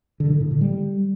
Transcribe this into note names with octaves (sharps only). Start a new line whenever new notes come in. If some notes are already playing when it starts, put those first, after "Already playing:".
D3
D3
A2
D3
G3